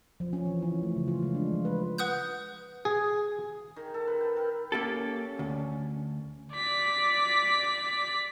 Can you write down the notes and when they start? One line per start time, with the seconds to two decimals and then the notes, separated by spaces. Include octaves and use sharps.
0.20 F3
0.33 C#4
0.45 E3
0.62 C#4
0.83 A3
0.96 C#3
1.08 F4
1.22 G#3
1.35 D4
1.53 F3
1.65 B4
1.98 B4 F#5 D#6 F#6 G6
2.85 G#4
3.76 D#3
3.94 A4
4.08 B4
4.21 G5
4.36 A#4
4.72 A#3 C#4 G4 A4
5.39 D2
6.52 D5 B6